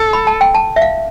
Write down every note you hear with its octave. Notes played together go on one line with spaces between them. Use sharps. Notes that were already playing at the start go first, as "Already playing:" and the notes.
Already playing: A4
B5
A5
G5
A5
E5
F5